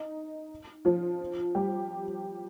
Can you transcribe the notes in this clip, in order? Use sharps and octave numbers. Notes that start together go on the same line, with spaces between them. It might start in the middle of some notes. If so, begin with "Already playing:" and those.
Already playing: D#4
F3 F4
G3 G4